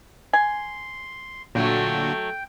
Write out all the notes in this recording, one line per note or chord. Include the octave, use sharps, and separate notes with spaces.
G#5 C6
A#2 D3 F#3 A3 F#4 G5